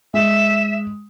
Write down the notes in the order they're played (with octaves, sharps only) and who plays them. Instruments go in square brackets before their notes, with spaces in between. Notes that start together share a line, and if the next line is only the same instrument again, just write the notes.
[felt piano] G#3 [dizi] E5